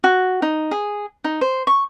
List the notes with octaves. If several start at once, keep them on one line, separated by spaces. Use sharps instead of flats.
F#4
D#4
G#4
D#4
C5
C#6